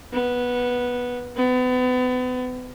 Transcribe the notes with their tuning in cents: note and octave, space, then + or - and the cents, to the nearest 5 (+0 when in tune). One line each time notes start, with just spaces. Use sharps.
B3 -10
B3 +35